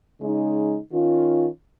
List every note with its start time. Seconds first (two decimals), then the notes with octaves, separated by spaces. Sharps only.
0.21 C#3 G#3 D#4
0.91 D#3 C#4 F4